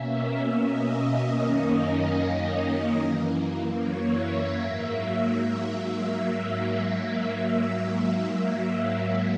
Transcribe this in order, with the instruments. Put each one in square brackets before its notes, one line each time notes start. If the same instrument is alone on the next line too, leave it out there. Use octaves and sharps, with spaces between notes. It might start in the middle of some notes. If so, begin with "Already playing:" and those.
Already playing: [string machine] B2 A#3 C#4 E5
D#5
F#2 D#3 A#3 C#4 D#5
D#5
D#5
F#2 E3 A#3
C#5
E5
G#2 F#3 A#3 E5